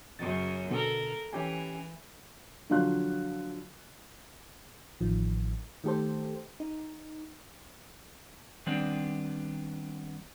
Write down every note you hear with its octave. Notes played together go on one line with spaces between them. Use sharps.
F#2 C#3 A6
B2 D3 A4 A#4
E3 C#4 G4 G#5
D3 F3 F#3 F5 C6 F#6
A1 D#3 F3
D#3 A3 G4 A4 C5
D#4
D#3 G3 B3 C4 D4